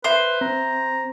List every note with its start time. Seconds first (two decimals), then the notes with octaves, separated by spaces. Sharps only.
0.04 B4 C5 E5 C7
0.41 C4 A#5